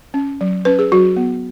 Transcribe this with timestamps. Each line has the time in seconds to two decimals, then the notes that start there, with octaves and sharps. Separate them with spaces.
0.14 C#4
0.41 F#3
0.65 C#4 B4
0.79 G#4
0.92 F#3 F#4
1.17 B3